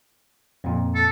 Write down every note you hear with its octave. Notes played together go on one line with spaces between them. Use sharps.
F2 A#2
A4